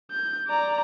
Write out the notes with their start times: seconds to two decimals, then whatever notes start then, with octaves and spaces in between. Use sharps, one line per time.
0.11 G6
0.48 D5 A#5